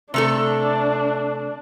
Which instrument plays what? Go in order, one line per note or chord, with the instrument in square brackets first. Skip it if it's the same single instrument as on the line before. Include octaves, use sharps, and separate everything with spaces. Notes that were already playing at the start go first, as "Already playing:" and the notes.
[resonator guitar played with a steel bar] C3 A3 A4 [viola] D4